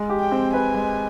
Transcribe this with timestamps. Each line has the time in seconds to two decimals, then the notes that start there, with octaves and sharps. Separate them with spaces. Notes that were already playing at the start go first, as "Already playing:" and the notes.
Already playing: G#3
0.09 G4
0.20 G5
0.31 C4
0.53 B4 G#5
0.75 G#3